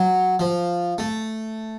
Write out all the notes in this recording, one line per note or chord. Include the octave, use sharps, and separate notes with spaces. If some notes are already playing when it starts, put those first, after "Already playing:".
Already playing: F#3
F3
A3